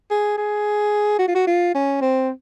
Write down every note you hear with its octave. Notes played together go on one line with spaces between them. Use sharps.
G#4
G#4
F#4
F4
F#4
F4
C#4
C4